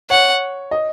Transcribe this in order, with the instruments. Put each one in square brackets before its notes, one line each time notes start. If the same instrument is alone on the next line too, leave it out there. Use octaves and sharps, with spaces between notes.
[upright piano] C#5 [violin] F#5
[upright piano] D#5